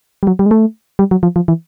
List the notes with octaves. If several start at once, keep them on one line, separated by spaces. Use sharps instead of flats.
G3
F#3
G3
G#3
A3
G3
F#3
F3
F3
E3